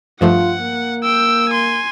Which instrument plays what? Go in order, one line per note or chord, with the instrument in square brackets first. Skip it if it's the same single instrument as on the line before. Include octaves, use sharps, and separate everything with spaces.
[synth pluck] G2 F3 A3 [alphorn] F4 [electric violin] F#5
[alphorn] A#3
[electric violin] G5 E6
G#5 C6